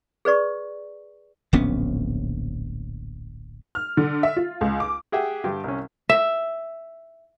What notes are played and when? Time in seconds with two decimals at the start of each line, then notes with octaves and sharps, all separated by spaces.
0.25 G#4 B4 D5 C#6
1.53 D1 A#1 B3 C#4
3.75 F6
3.97 D3
4.23 E5
4.37 F4
4.61 C#2
4.80 D6
5.12 G4 G#4 E5 F#5 G5
5.44 G2 D3 G4
5.64 C2 C#4
6.09 E5